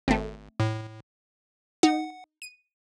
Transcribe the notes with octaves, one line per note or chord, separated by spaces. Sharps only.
G#1 A3 C4
A2
D#4 F#5
D#7